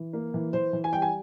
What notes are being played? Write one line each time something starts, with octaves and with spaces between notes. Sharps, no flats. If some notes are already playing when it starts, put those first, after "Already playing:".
Already playing: E3
A#3
E3
E3 C5
E3
G#5
G3 G5
G#5